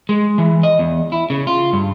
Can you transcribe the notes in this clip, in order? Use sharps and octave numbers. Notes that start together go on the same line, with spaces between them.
G#3
E3
D#5
E2
E4
C#3
F4
G2